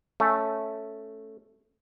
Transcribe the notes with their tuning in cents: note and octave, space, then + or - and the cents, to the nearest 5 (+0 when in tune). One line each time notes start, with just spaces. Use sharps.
A3 +0 C#4 +0